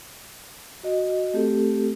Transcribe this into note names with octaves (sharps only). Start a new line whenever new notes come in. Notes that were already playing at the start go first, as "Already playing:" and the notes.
F#4 D#5
A3 C4 G4 A4